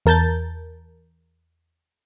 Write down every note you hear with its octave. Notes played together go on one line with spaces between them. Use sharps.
E2 A#4 A5 G6 A6